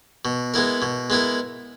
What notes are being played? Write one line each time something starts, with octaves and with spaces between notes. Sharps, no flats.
B2
G#3 B3 E4 A#4
B2
G#3 B3 E4 A#4